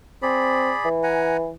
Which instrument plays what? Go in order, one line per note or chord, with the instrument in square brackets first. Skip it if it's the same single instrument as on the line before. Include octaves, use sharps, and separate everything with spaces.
[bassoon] C4 [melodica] G#4 D5 B5
[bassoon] E3
[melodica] F#5 G#5 A#5